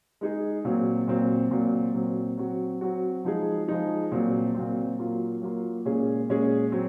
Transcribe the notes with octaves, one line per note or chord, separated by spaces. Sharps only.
G#3 D#4 G#4
A#2 F#3 C4
A#2 F#3 C4
A#2 F#3 C4
A#2 F#3 C4
F#3 C4 F#4
F#3 C4 F#4
F3 G#3 D#4 G#4
F3 G#3 D#4 G#4
A#2 F#3 C4
A#2 F#3 C4
F#3 A#3 F4
F#3 A#3 F4
A#2 G#3 C#4 G#4
A#2 G#3 C#4 G#4
F#3 C4